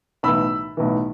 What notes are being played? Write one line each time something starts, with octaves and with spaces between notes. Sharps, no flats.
B1 A2 E3 B5 E6
B1 A2 E3